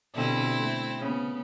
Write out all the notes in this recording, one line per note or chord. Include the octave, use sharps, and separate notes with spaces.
B2 D3 G3 C4 E4
A3
C#3 B3